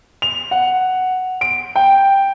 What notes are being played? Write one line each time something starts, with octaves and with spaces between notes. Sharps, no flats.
F7
F#5
D7
G5